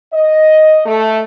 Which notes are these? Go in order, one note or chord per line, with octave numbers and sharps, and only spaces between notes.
D#5
A3